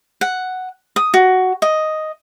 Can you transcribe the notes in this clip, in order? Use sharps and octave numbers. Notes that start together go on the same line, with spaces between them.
F#5
D#6
F#4
D#5